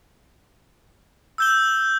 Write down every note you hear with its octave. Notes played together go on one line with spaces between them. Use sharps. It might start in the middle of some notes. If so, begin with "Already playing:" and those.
E6 G6 G7